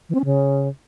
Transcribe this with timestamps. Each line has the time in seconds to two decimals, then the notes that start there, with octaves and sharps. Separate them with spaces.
0.09 E3
0.15 C4
0.20 C#4
0.25 C#3